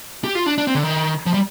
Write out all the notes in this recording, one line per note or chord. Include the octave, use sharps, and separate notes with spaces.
G4
F4
D4
D4
C4
D3
D#3
F3
G3